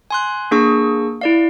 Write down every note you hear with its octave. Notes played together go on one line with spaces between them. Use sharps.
G#5 C6 F#6
A#3 D4 G#4 C#6 E6
E4 D5 F5